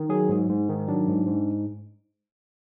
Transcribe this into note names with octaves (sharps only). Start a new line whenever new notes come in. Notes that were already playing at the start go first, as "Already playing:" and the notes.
Already playing: D#3
F#3 G#4
G#2
G#2
D#3
F#3 D4
G#2
G#2